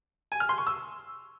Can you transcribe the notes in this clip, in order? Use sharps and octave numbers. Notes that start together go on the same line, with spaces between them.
G#5
F6
C6
C#6
E6